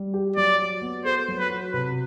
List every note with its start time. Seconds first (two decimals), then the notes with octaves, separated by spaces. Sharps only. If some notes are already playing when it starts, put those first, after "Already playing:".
Already playing: G3
0.14 G4
0.37 F#3 D5
0.59 F#4
0.82 B3
1.05 A4 C5
1.28 F#3
1.39 B4
1.50 F#4
1.73 C3 B4